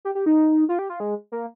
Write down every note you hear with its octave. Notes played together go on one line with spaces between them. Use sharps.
G4
G4
D#4
F4
G4
F4
G#3
A#3